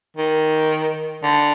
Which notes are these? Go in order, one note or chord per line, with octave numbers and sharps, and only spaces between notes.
D#3
D3